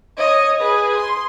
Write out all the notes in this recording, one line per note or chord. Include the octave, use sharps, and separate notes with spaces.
C#5 D#5
G#4 B4
C6